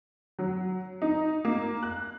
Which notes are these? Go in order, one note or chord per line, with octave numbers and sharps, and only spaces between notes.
F#3
D#4
A#3
F#6